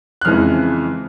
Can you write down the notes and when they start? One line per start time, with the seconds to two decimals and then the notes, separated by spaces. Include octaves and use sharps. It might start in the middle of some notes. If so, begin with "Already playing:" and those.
0.21 F#6
0.25 F2 C#3 E3 G#3 F6